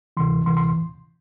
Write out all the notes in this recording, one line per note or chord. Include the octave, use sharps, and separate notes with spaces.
D2 C3 E3 C6
D2 C3 E3 C6
C6